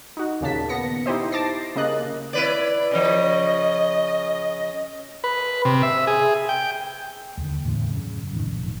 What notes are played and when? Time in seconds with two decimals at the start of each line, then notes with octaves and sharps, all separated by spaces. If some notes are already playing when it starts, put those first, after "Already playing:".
0.17 D#4 F#4
0.41 D#2 A#2 C#3 A#3 A5 B6
0.69 B3 A#6 C#7
1.06 D#4 E4 G4 C5 D#5
1.32 A5 D6 A6 A#6 C7
1.75 C#3 A#3 D#5 F#6
2.33 E4 B4 D5
2.91 C#3 F3 D#5
5.24 B4
5.65 C3
5.83 E5
6.07 G#4
6.49 G5
7.37 D#2 D3
7.63 E2 A2 D3 E3
7.90 F#2 C#3
8.32 F2 A2 D#3
8.46 F1 A#1